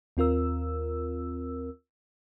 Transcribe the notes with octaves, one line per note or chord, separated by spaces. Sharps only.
D#2 C4 F4 A#4 E6